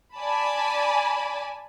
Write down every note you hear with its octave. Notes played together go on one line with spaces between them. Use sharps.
D5 G#5 A5 B5